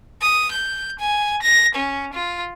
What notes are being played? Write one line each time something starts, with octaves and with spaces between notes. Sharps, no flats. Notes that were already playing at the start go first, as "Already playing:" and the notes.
D#6
G6
G#5
A#6
C#4
F4